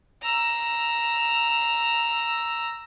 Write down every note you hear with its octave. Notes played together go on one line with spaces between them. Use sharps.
A#5 E6